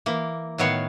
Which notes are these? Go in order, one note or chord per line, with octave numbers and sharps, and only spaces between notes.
E3 A#3
A2 D#3 F#3 B3 C#5 F5